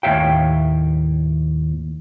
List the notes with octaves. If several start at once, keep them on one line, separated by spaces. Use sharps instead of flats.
D#2 A2 E5 F5 G5